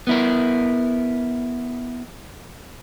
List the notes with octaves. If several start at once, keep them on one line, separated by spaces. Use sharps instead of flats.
B3 E4 A#4